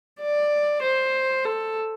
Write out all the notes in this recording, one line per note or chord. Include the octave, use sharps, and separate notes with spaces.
D5
C5
A4